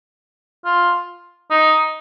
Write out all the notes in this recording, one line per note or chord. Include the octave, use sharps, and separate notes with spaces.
F4
D#4